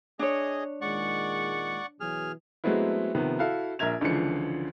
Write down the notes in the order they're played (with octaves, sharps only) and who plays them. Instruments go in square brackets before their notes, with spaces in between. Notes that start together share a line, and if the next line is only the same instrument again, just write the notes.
[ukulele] D4 C#5 [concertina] G#4 D#5
[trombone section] A#2 D#3 G#3 [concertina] D5 F#5 C#6
[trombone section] B2 E3 F#3 [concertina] G#4 F6
[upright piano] F#3 G#3 A3 B3 C4 E4
C3 D#3 F3 B3
E4 F#4 A4 F5
A#1 A#4 E5 G#6 F7
C#2 D3 E3 F3 C#7